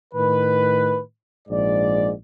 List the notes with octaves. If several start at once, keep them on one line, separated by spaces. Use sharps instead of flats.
A2 D#3 B4
A#1 G#2 D5